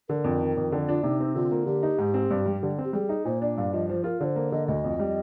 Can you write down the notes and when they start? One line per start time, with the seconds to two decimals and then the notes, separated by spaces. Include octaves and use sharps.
0.09 D3 A#4
0.24 F2
0.41 D#3
0.57 F2
0.72 D3
0.88 D4 F4
1.03 C3 D#4
1.20 C4
1.36 D3 F4
1.52 A#3
1.66 D3 G4
1.83 D#4
1.98 G#2
2.14 C4
2.31 G2
2.46 G3
2.63 D3
2.78 C4
2.84 G4
2.93 G3 G#4
3.09 D#4
3.25 A#2 C5
3.41 D4 D5
3.57 G2 F5
3.73 F3 D#5
3.89 F3 C5
4.04 F4 A#4
4.20 D3 C5 D5
4.36 A#3
4.52 D3 D#5
4.68 D2 D#5
4.84 F2
4.99 G3